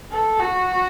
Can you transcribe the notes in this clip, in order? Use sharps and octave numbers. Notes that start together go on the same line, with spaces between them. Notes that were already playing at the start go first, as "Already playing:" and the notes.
A4
F#4